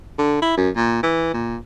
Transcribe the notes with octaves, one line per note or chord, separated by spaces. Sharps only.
D3
E4
F#2
A#2
E3
A#2